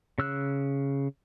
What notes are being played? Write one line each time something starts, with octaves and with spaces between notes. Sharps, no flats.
C#3 E6 F#6